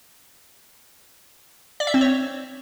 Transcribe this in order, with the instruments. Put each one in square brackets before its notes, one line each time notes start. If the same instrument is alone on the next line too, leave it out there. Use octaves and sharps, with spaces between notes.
[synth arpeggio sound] D5
E5
C4
C#5